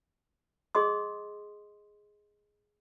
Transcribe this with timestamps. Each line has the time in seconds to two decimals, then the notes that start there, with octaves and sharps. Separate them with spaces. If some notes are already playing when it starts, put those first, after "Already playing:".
0.75 G#4 D#5 C6 D#6